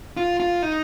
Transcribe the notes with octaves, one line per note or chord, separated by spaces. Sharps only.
F4
F4
D#4